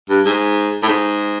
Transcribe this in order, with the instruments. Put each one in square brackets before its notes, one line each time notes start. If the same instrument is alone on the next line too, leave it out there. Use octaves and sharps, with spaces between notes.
[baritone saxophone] G2
G#2
A2
G#2